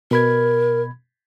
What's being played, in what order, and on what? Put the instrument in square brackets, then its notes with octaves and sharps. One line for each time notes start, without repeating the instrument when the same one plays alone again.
[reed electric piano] B2 B5 G#6 [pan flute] A#4